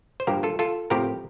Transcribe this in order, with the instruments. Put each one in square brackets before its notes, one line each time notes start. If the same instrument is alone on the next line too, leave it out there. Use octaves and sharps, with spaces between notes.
[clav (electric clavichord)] C5
G2 F3 A#3 G4 A#4
F4 A4
F4 A4
A2 F3 C4 G4 A#4